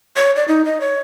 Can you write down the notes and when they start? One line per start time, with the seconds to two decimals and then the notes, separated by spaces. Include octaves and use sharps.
0.16 C#5
0.36 D5
0.48 D#4
0.65 D#5
0.81 C#5